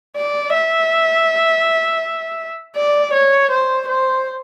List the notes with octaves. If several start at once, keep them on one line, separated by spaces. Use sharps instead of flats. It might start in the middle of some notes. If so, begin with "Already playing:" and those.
D5
E5
D5
C#5
C5
C5